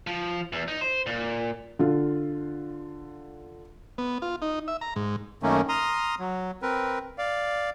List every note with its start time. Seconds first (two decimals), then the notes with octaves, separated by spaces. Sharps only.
0.07 F3
0.53 E2
0.68 D#4
0.81 C5
1.06 A#2
1.79 D3 F4
3.98 B3
4.22 F4
4.42 D#4
4.68 E5
4.81 A#5
4.96 G#2
5.43 F#2 D#3 A3 A#3 C#4
5.69 A#5 C6 D#6 F6
6.19 F#3
6.62 C4 A#4 B4
7.18 D5 F5